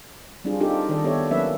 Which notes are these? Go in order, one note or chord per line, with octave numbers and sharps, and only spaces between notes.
G3 C4 D4 F4 G#4
C4 D4 D#4 F4 G4 A4
D#3 A4 D5 D#5
B3 G4 A4 C#5 D5 E5
F#3 A#3 C#4 B4 E5